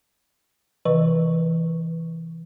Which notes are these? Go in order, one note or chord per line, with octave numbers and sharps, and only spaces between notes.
C3 E3 B4 C#6